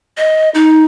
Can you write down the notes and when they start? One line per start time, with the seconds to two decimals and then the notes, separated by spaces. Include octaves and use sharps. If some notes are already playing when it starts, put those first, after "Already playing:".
0.18 D#5
0.55 D#4